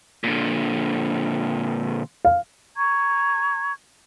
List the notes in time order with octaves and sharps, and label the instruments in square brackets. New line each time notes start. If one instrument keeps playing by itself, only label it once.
[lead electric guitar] A#2 D3
[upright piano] F5
[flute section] A#5 C#6 G#6